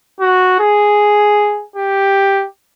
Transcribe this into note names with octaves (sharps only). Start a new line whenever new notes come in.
F#4
G#4
G4